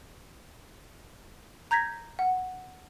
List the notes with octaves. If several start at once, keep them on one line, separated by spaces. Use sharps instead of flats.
A#5 G6 G#6 A#6 B6
F#5